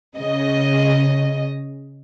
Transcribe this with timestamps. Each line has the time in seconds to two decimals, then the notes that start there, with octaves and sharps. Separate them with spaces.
0.19 C#3 D#5